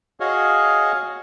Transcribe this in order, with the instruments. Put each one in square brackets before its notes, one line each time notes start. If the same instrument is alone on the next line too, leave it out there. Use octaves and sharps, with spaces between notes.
[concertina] F#4 G#4 C#5 D#5 F5